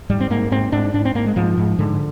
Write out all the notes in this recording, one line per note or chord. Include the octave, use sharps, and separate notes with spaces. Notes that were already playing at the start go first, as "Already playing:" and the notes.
G#2 G3
C4
G#2 A#3
G#2 C4
G#2 D4
G#2 D4
C4
G#2 A#3
G#3
G#2 F3
G#2
G#2 D3